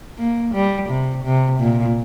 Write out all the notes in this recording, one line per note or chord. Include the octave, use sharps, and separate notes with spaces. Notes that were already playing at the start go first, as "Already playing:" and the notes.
A#3
G3
C3
C3
A#2